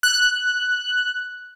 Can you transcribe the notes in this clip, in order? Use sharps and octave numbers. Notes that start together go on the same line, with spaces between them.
F#6